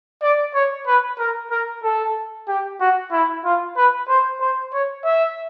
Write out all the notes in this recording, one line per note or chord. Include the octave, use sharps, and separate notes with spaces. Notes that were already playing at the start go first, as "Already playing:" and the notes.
D5
C#5
B4
A#4
A#4
A4
G4
F#4
E4
F4
B4
C5
C5
C#5
E5